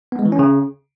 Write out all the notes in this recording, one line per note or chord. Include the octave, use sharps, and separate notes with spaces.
B3
G#3
E3
C#4
C#3